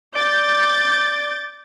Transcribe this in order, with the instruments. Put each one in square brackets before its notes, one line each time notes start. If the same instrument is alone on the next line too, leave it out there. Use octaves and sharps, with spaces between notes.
[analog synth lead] D5 [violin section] D6 G6 A6